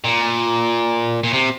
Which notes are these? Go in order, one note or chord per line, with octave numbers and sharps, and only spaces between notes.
A#2
A#2
C3